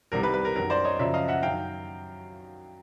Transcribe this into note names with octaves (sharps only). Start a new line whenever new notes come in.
C2 C3 D#3 G3 A#4
B4
B4
A#4
F#2 D#3 F#3 A#4
C5 D5
C#5 D#5
F#2 C#3 F3 D5 E5
D#5 F5
E5 F#5
F#2 D#3 F#3 F5 G5